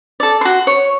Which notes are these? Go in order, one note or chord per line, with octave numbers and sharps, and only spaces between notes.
A4 D5
F#4 C6
C#5